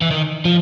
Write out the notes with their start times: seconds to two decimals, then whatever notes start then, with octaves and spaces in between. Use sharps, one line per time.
0.01 E3
0.11 D#3
0.45 F3